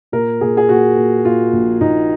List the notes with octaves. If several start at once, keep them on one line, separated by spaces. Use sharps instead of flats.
A#2 A#4
A#2 G#4
G#4
A#2 F#4
A#2
A#2 F4
A#1
A#1 D#4